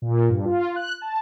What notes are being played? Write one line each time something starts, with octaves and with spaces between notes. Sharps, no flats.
A#2
G2
F4
F#6
A5